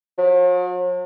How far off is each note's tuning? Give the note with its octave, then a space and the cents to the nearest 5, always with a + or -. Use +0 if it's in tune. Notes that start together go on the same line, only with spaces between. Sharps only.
F#3 -45